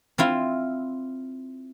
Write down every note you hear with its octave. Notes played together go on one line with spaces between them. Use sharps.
C4 E4 F4